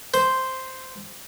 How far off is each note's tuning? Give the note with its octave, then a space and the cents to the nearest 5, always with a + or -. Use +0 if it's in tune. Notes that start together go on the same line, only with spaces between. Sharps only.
C5 -5